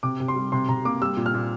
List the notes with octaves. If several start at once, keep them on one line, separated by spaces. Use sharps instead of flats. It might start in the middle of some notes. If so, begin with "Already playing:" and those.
C3 D6
C3
C6
G3
C3 C6
C3 A#5
A#3 D6
G3 E6
A#2
F6
A#2